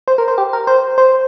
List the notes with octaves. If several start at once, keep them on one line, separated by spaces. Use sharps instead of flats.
C5
A#4
C5
G4
A#4
C5
C5